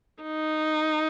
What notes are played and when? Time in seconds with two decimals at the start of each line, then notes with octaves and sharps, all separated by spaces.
0.23 D#4